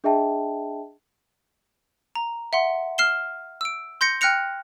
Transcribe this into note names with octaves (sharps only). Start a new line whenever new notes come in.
D4 G#4 D#5 E5 G5 A5
A#5
E5 F#5 C6
F6 C7 E7 G7
E6 D7
C6 G6 A#6 C#7
G5 F6 F#6 A#6 C#7 F7